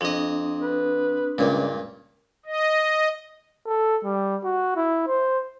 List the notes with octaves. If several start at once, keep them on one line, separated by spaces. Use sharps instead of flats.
F2 C4 D4 D#5 D#6
B4
C#2 G2 A#2
D#5
A4
G3
F#4
E4
C5